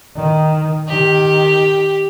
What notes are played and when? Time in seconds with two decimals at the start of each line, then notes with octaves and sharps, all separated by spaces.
0.16 D#3
0.88 D#3 G4